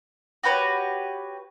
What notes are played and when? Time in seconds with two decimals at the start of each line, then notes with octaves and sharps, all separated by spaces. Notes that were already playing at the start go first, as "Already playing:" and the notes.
0.43 F#4 G4 B4 C#5